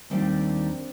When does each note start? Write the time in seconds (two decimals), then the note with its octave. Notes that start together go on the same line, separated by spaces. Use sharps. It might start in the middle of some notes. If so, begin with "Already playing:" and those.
0.10 D#2 D#3 G3 C4 D4